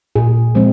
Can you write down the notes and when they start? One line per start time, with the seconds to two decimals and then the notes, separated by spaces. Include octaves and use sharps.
0.16 A#2 G#4
0.55 F3 G#3 C4